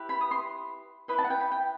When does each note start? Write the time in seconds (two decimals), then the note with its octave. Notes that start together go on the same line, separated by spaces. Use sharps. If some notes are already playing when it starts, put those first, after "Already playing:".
Already playing: E4 G4 B4
0.09 B5
0.21 D#6
0.31 C6
1.08 E4 B4 D#5 B5
1.19 A5
1.24 F#5
1.30 G5
1.41 B5
1.52 G5